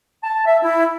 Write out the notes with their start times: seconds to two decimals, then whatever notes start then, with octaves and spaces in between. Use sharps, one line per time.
0.24 A5
0.46 E5
0.63 E4